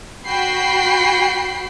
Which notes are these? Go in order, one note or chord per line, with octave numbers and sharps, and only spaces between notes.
F#4 G5 B5 C7